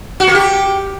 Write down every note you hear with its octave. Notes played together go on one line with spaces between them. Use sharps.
F#4
A#3
G4